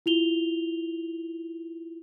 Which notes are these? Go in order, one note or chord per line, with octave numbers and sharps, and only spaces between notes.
E4 F4 F7 G7